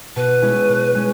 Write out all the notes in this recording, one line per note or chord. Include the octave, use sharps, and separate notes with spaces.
B2 B4
G#3 C#4 E4
B2
G#3 C#4